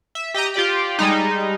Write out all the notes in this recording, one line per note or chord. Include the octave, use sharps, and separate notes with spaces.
E5
G4 D#5 G5 A#5
F4 G4 D5 G5
G3 G#3 D#4